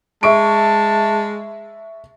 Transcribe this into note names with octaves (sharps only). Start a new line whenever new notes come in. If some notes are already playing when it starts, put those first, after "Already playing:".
G#3 E5 A5 C#6 D7